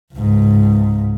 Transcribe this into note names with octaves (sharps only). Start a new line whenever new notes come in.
C#2 G#2